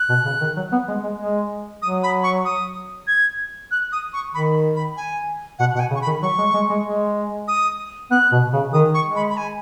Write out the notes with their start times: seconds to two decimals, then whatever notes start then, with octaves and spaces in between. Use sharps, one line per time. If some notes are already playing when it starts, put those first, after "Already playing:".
Already playing: F#6
0.09 B2
0.25 C#3
0.41 D#3
0.56 F#3
0.72 B3
0.88 G#3
1.03 G#3
1.19 G#3
1.82 F#3 D#6
2.03 B5
2.23 C#6
2.45 D#6
3.07 G#6
3.71 F#6
3.92 D#6
4.13 C#6
4.34 D#3 B5
4.76 B5
4.97 G#5
5.59 B2 F#5
5.75 B2 F#5
5.80 G#5
5.90 C#3
5.95 C#6
6.02 B5
6.07 D#3
6.22 F#3 C#6
6.38 G#3
6.54 G#3
6.69 G#3
6.85 G#3
7.48 D#6
8.11 B3 F#6
8.32 B2
8.53 C#3
8.73 D#3 D#6
8.94 C#6
9.05 G#3
9.16 B5
9.30 B5
9.37 G#5